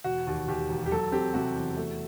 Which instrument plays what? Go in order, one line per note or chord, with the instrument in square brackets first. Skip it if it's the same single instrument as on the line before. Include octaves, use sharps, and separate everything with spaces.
[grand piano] E1 F#4
D#2
D#2 G4
E1
G4
F#3 A4
C4 G4
C3 F#4
E2
A3